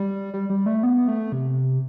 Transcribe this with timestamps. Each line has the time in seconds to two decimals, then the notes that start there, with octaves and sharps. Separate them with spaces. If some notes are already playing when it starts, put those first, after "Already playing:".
Already playing: G3
0.34 G3
0.50 G3
0.66 A3
0.83 B3
1.08 A3
1.32 C3